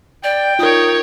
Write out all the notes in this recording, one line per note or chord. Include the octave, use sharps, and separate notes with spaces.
D5 G5
D#4 F4 A#4 C#5 D#6